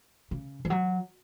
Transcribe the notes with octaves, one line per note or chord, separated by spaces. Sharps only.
C#3
E3
F#3